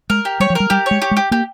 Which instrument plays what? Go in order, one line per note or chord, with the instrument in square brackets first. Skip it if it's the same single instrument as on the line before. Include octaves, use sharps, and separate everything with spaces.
[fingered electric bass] G#3 [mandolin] A#4
[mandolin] G4
[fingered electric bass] G3 [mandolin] C#5
[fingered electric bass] F3
[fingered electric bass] G3 [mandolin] A#4
[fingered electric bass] G3 [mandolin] G4
[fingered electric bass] G#3 [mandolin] C#5
[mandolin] G4
[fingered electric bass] G#3
[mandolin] G4
[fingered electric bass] A#3 [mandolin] G4